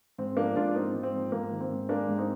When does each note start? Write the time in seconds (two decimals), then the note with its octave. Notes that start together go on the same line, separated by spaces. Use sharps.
0.18 G#2 C4
0.37 F3 A#3 D4
0.56 G#2 D4 F4
0.75 A#3 C4 D#4
0.94 G#2
1.03 C4
1.13 F3
1.32 G#2 A#3
1.51 D#3
1.60 C4
1.70 G#2
1.89 G#3 A#3 D4
2.09 G#2
2.18 C4 D#4